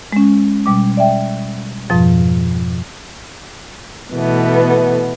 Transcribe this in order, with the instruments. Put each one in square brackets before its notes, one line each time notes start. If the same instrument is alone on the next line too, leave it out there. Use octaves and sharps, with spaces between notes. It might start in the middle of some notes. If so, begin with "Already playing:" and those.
[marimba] G#3 C#4
B2 G3 D6
D5 E5 G5
F2 G#2 B2 F3
[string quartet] B2 E3 A3 B3